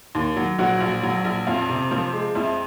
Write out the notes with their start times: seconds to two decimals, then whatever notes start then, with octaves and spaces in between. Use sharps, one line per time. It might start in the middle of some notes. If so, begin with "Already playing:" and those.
0.15 D#2
0.36 F#3
0.59 A#1 F#3 F#4
0.81 A#1
1.03 F#3
1.25 A#1
1.47 F2 F4
1.69 C3
1.91 F3
2.13 G#3
2.35 F2 E4